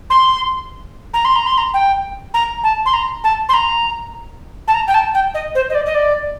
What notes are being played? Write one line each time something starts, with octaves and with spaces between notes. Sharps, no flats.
C6
A#5
C6
A#5
C6
A#5
G5
A#5
A5
C6
A#5
A5
C6
A#5
A5
A#5
G5
A5
G5
D#5
C5
D#5
D5
D#5
D5